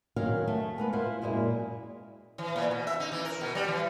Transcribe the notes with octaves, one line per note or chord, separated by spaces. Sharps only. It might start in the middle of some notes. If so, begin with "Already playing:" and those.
E2 D#3 F#3 A#4 F5
A3
G#3 B3 A#4 B4
E4 F4 C5 F5
F#2 A#2 G#3 E4 A#4
E3
A#2
B2
E5
D#4
E3
A#4
B2
G3
E3